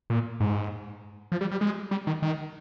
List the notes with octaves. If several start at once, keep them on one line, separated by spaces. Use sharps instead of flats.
A#2
G#2
F3
G3
G3
G#3
G3
D#3
D#3